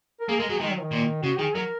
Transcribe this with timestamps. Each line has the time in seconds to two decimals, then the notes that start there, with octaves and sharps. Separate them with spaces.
0.21 A#4
0.29 A#3 G#4
0.39 G#3 A#4
0.49 F#3 G#4
0.60 D#3 G#3
0.71 F#3
0.81 D#3
0.92 A#2
1.23 C#3 F#4
1.39 D#3 G#4
1.55 F#3 A#4